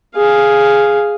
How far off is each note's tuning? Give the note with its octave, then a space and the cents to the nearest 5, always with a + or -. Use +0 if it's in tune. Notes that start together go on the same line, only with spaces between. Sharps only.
G#4 +0 F5 +0